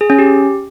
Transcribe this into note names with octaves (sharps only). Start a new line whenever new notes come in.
G#4
C#4
G4